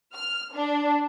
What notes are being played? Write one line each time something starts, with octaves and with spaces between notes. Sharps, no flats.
F6
D4